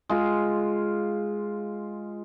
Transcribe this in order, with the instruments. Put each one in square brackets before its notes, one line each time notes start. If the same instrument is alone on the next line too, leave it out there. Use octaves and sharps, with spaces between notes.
[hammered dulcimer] G#3 F4